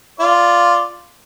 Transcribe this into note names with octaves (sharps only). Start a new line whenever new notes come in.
F4 D5